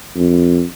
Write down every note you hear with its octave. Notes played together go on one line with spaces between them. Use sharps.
F2